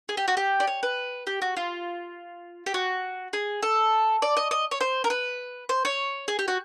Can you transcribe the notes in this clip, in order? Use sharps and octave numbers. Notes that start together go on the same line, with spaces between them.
G#4
G4
F#4
G4
D5
C#5
B4
G4
F#4
F4
G4
F#4
G#4
A4
D5
D#5
D#5
C#5
C5
A#4
B4
C5
C#5
G#4
G4
F#4